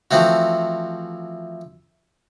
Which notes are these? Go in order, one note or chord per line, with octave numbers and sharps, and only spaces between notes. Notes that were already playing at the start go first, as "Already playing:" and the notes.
E3 F3 A3 C4 F#4